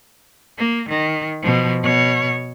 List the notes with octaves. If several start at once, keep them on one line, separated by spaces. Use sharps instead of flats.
A#3
D#3
B2 F3
B2 C#5